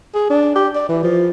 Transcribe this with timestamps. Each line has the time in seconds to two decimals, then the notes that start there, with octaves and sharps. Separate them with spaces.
0.14 G#4
0.30 D4
0.55 G4
0.75 D5
0.89 E3
1.03 F3